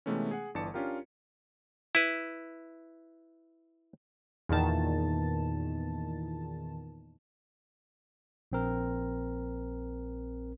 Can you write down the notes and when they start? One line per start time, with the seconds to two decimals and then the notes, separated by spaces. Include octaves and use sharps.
0.06 C3 E3 G#3 A3 B3 C#4
0.31 G#4 F#5
0.55 G1 D3 E3 D5 A5 C#7
0.74 C#4 D4 F4 G4 A#4
1.95 E4 B4
4.49 E2 A#2 D#3 A5
8.52 A#1 C4 A#4